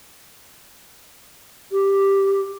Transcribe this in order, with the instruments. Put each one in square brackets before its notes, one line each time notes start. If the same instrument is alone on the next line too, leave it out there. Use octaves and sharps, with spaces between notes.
[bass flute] G4